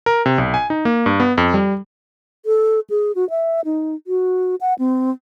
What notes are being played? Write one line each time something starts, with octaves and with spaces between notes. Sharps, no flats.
A#4
C3
B1
G#5
D#4
A#3
G2
B3
F2
G3
A4
G#4
F#4
E5
D#4
F#4
F#5
C4